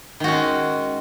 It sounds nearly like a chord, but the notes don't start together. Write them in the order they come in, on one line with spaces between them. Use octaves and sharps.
D#3 F#4 C#4 G#3